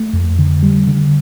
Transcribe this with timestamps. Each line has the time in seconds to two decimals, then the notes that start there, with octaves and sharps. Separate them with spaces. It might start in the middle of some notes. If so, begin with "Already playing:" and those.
Already playing: A3
0.13 F2
0.39 D3
0.63 G3
0.87 D3